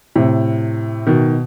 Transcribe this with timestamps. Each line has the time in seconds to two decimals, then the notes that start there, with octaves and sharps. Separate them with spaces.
0.16 A2 C3
1.07 B2 D#3